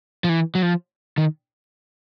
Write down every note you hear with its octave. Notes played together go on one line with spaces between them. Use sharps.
F3
E3
F#3
F3
D#3